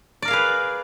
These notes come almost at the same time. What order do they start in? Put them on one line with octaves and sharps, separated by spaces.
D5 A#4 F5 G#4 B4